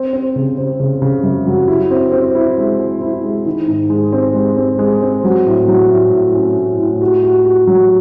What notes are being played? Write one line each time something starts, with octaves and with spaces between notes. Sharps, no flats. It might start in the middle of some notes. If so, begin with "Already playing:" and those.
Already playing: C4
C4
C#3
C4
C#3
C#3
F#2
F#3
E4
C4
C4
E4
G#3
C5
E4
G#3
D#3
G#2
G#3
C4
G#3
C4
G#3
C4
F#3
A2
F#3
A2
A2
C#4
A2
A2
F#4
F#4
F#4
F#3